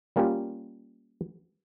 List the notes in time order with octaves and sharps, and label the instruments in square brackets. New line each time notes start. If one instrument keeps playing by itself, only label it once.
[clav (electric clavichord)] G3 A#3 C#4 F4 G4